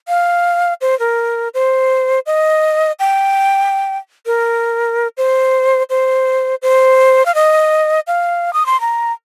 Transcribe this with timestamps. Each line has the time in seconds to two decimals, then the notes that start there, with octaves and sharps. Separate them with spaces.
0.08 F5
0.81 C5
0.99 A#4
1.54 C5
2.26 D#5
2.99 G5
4.26 A#4
5.17 C5
5.90 C5
6.62 C5
7.25 F5
7.35 D#5
8.07 F5
8.53 D#6
8.66 C6
8.80 A#5